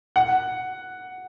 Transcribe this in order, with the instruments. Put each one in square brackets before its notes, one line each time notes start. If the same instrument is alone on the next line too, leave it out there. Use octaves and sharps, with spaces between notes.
[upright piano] F#5